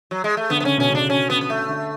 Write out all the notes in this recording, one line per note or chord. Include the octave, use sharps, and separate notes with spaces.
F#3
G#3
A3
D3 B3
B3
C#3 C#4
B2 C#4
C#3 D4
C#4
B3
B3
A3
D3